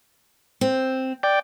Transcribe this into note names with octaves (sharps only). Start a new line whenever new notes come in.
C4
D5 G5